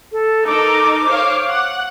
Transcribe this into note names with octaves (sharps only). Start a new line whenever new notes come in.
A4
D#4 A4 A#4 D6
C5 C#5 F5
F#5